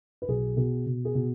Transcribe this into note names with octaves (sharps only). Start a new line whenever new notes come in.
B4
B1 G#4
B2 G#4
B2
G#4
B2